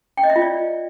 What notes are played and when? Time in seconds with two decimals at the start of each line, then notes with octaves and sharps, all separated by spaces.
0.17 G5
0.24 D#5
0.30 E5
0.36 F4
0.42 D5